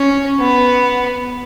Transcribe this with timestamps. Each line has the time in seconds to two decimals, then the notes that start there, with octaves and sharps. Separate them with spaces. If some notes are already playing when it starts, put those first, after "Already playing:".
Already playing: C#4
0.40 B3